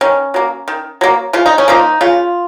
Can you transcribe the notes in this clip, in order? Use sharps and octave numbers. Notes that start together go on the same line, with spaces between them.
D#3 C#4
F#3 A#3
D#3
F#3 A#3
C#3 F4
D#4
C#4
F3 A#3 D#4
C#3 F4